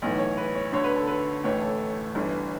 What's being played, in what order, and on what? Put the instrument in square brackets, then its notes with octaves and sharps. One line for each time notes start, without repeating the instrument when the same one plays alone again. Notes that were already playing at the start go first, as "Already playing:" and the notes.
[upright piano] B1 A2 E3
C#5
B4
C#5
D2 D3 C#5
B4
A4
B4
A1 A2 E3 C#5
A4
G1 G2 E3